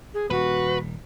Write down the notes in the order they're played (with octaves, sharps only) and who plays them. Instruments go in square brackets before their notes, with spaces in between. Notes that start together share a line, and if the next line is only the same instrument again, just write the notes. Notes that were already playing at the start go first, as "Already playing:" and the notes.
[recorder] G#4
[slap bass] D#1 [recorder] F#4 [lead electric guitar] B4